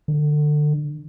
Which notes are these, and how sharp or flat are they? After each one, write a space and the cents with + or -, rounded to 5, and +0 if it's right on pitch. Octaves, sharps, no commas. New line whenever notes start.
D3 +25